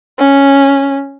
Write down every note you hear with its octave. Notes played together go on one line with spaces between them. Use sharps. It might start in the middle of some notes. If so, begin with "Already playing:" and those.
C#4